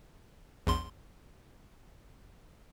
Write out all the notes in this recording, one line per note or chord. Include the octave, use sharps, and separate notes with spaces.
A#1 E2 C6